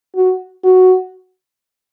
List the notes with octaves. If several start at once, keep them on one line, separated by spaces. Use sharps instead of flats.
F#4
F#4